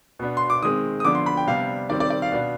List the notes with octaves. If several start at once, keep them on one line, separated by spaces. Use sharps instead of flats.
B2 B3 D4
C6
D6
D#3 G#3 C4 D#6
D#6
D3 F3 B3 D4 D6
C6
B5
G5
C3 G3 B3 D4 F5
D#3 G3 C4 D5
D5
D5
F5
B2 B3 D4